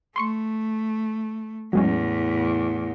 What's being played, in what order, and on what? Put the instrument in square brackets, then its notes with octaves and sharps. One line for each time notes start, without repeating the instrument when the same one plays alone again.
[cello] A3 [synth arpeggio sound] C6 C#6 C#7
[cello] E2 A2 [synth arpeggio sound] F#3 G#3 C#4